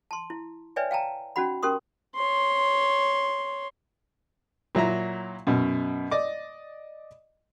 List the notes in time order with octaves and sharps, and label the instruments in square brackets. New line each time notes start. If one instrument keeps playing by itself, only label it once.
[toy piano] A5 C6
E4
B4 C#5 D5 E5 G5 G#5
F5 G5 A5 A#5
C#4 D#4 F#4 F#5 B5
C#4 G4 A#4 C6 D#6
[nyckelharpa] C#5 C6
[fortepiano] A#2 F#3 E4 A#5
F#2 B2
D5 D#5 D6